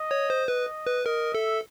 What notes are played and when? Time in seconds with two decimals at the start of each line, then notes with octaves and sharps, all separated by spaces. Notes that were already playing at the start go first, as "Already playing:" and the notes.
Already playing: D#5
0.11 C#5
0.30 C5
0.48 B4 D#5
0.87 B4
1.05 A#4 D#5
1.34 A4 E5